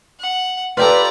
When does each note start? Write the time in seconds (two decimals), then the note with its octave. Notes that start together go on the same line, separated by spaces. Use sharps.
0.20 F#5
0.77 F4 G4 A4 B4 D5 A#5